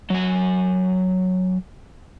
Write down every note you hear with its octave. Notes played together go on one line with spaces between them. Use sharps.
F#3 G#5